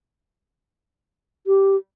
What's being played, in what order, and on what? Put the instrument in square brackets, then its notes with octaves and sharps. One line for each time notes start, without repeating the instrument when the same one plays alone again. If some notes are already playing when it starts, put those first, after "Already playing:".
[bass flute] G4